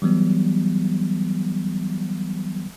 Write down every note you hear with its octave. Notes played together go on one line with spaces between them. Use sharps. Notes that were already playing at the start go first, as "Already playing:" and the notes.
E3 F#3 G3 B3